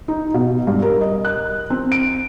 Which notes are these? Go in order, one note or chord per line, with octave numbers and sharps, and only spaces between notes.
D#4
B2
G2
A#4
D#5
F#6
C4
D7